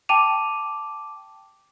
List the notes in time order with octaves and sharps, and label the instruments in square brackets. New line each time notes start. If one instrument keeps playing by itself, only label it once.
[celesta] G5 A5 D6 D#7 F7